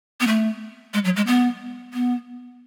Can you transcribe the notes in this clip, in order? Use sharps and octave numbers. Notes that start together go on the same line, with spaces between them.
B3
A3
G#3
F#3
G#3
B3
B3